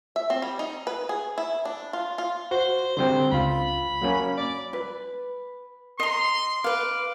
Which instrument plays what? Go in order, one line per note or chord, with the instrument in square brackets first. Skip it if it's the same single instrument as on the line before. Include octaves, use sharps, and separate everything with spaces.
[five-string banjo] E5
C4
G3
D#4
B4
G#4
E4
D4
F4
F4
[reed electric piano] F#4 [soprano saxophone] C5
[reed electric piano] D3 G3 C4 [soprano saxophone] C5
[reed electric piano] C#2 F4 [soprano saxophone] B5
[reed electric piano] F#3 A#3 C#4
[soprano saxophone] D5
[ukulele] B4
[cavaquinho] D#5 A#5 [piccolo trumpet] C6
[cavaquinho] B4 F5 [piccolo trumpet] D6